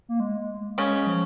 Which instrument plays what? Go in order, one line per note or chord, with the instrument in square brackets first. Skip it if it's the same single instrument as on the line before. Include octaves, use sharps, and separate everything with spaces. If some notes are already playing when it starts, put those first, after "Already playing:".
[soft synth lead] A#3
G#3
[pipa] C#3 C#4 [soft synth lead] G#3
[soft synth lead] F3